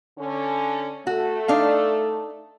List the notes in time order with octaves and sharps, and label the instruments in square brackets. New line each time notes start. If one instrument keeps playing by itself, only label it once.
[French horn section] D3 C#4
[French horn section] A3 A4 [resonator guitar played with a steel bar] F#4
[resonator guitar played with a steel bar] D4 D#4 F5